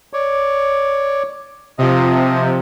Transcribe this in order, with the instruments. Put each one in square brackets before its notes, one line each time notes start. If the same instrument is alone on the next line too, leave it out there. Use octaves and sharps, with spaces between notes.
[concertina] C#5 D5
[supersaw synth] C3 F3 [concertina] D#5